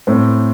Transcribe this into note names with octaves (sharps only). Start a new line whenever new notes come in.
A2 C4